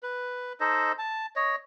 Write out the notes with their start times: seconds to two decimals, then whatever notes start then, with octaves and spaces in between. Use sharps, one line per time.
0.03 B4
0.60 D#4 A4 C5 D#5
0.99 A5
1.36 C#5 D#5